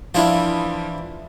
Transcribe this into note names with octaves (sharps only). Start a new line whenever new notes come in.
E3 F3 D4 E4 F4